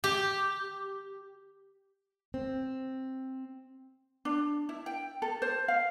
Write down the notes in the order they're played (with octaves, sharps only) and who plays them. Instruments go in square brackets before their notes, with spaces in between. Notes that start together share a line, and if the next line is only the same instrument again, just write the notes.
[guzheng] G4
[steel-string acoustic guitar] C4
[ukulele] D4
E4
G5
A4
C5
F5